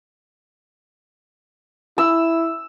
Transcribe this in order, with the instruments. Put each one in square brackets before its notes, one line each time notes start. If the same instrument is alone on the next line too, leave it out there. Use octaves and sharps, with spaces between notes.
[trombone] E4 [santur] E6